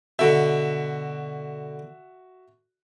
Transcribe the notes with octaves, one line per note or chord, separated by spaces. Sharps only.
B2 D3 F#4 E5